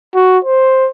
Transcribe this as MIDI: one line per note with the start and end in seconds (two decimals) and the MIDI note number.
0.15 0.38 66
0.45 0.89 72